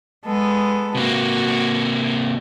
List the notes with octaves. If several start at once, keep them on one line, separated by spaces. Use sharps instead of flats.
G#3 B3 A4
C3 A#3 F#4